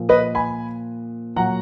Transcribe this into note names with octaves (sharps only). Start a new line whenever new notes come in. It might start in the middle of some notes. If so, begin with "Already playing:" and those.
Already playing: A#2 F3
B4 D#5
G#5 B5
A#2 F#3 F#5 A#5